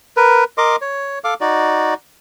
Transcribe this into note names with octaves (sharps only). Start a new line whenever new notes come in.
A#4 B4
A#4 D#5 C6 D6
C#5
A4 F5 D6
D#4 F#4 D5